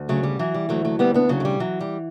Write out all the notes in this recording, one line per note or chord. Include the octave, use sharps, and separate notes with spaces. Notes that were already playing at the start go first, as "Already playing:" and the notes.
Already playing: D2
C#3 F#3 A3
G3
E3 F#3
G3
D2 F#3 A3
F#3 A3
D2 G3 B3
B3 D4
C#3 F#3
A3
G3
E3 F#3
G3